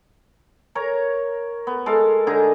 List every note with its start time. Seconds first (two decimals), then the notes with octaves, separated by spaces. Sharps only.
0.75 A#4 C#5 A#5
1.67 B3
1.86 G#3 A4 A#4 F5
2.27 D3 D#4 G#4 A#5